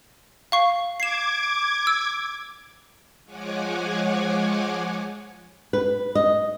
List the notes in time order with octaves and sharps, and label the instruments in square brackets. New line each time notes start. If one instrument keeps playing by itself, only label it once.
[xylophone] F5 C#6 C7
[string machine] D6 G#6 [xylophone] C7 E7
[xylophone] E6
[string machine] F3 G#3 C#5 F#5 G#5 D6
[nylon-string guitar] B4
D#5